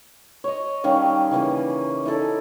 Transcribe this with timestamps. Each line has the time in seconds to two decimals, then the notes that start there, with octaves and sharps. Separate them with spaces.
0.44 C#5 D#5
0.84 D#3 G3 C#4 F5
1.31 C#3 E3 A#3 G#4
2.05 D#4 E4 A4 D5